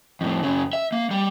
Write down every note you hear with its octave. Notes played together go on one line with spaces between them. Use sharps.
F2 A2
F#2 C#3
E5
A#3
G3